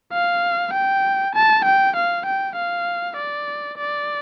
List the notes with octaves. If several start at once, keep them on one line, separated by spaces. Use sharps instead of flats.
F5
G5
A5
G5
F5
G5
F5
D5
D5